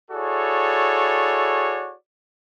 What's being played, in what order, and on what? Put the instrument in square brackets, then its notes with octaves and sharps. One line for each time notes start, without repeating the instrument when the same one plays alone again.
[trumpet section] E4 F#4 G#4 A4 C#5 D5